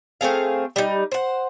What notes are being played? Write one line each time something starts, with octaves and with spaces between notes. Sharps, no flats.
A3 C4 G#4 F5
G3 D#4
C5 F#5